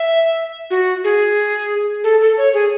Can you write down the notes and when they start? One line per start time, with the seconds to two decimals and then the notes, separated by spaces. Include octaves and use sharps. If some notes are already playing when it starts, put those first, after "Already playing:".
Already playing: E5
0.70 F#4
1.04 G#4
2.04 A4
2.21 A4
2.38 C#5
2.54 G#4